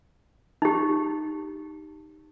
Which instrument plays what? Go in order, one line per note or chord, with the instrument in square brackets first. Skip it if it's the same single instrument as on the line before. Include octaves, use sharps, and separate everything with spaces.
[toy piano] D#4 G4